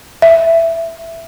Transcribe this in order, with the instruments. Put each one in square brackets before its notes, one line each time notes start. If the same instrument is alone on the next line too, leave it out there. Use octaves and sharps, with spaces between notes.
[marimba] E5